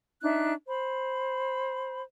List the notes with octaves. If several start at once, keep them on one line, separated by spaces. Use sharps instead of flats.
D4 D#4 E5 F#6
C5 B5